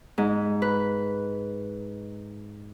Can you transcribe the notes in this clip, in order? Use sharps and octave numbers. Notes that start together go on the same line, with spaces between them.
G#2
B4